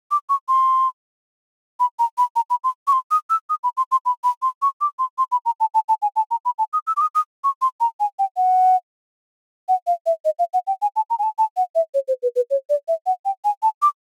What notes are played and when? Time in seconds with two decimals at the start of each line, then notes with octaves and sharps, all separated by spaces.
0.11 D6
0.29 C#6
0.48 C6
1.80 B5
1.99 A#5
2.18 B5
2.36 A#5
2.50 B5
2.64 C6
2.87 C#6
2.93 C6
3.11 D#6
3.30 E6
3.50 D#6
3.64 B5
3.77 C6
3.92 C6
4.06 B5
4.24 B5
4.42 C6
4.62 C#6
4.81 D6
4.99 C6
5.18 C6
5.32 B5
5.46 A#5
5.60 A5
5.74 A5
5.89 A5
6.02 G#5
6.16 A5
6.31 A#5
6.45 B5
6.59 A5
6.73 D#6
6.87 E6
6.97 D6
7.01 D#6
7.15 D#6
7.44 C#6
7.62 C6
7.80 A#5
8.00 G#5
8.19 G5
8.37 F#5
9.69 F#5
9.87 F5
10.06 E5
10.25 D#5
10.39 F5
10.54 F#5
10.67 G5
10.82 G#5
10.96 A5
11.10 A#5
11.19 G#5
11.23 A5
11.38 A5
11.57 F#5
11.75 E5
11.94 C#5
12.08 C5
12.23 B4
12.36 B4
12.51 C#5
12.70 D5
12.88 E5
13.06 F#5
13.25 G5
13.45 G#5
13.63 A5
13.82 D6